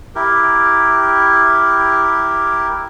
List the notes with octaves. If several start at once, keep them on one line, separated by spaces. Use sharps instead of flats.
E4 G4 A#4